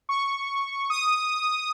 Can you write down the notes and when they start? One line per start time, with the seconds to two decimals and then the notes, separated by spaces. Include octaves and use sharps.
0.09 C#6
0.90 D#6